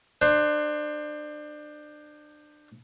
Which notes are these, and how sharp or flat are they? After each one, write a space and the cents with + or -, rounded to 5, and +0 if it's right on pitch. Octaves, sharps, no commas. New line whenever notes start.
D4 +30 C5 +5